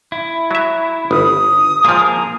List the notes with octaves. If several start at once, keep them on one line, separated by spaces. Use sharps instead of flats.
E4
F#3 E5
G1 D#6
A#2 F3 A#3 G#4 A#4